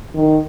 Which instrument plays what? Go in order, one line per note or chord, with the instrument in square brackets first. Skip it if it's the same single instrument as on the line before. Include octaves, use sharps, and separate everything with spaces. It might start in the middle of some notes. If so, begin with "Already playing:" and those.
[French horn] D#3